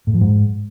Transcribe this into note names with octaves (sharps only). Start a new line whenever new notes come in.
A2
F3
G#2